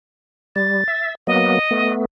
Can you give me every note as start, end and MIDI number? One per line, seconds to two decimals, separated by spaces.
0.56 0.84 55
0.56 1.11 93
0.88 1.15 76
1.27 1.59 54
1.27 1.59 58
1.27 1.59 59
1.27 1.93 75
1.71 2.05 57
1.71 2.05 59